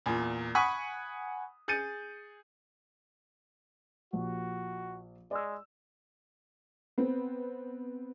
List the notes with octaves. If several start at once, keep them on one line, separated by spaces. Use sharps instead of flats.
E2 A#2
F#5 G#5 B5 C#6 D#6 B6
G#4 G6 A6 C#7 D#7
A#1 F#4 G4
G#3 D5 E6
B3 C4